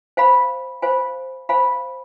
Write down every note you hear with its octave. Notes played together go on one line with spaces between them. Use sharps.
C5 F5 G#5 B5
C5 F5 G#5 B5
C5 F5 G#5 B5